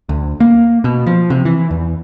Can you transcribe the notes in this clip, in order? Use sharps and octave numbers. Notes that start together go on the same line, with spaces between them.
D2
A#3
B2
F3
C3
E3
E2